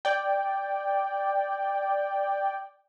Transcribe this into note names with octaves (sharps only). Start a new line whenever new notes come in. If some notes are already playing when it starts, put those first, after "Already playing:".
D5 G5